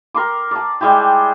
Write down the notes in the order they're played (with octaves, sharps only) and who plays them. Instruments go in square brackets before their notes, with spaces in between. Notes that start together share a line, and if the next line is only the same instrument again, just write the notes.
[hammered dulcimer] A#4 C6 D6
D5 A5
G3 G#3 E4 G4